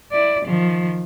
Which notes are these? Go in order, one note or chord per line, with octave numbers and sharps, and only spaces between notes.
E4 D5
D#3 F3